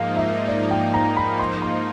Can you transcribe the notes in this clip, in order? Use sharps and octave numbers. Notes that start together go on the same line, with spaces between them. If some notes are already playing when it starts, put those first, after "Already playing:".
Already playing: G#2 F3 A#3 D#4 F5
E5
D5
G5
A#5
B5
C6
C6